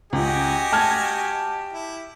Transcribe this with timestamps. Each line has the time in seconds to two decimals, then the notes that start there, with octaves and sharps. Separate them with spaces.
0.13 C#2 F#4 G4 D#5 G#5
0.72 A5 F6 G#6
1.73 E4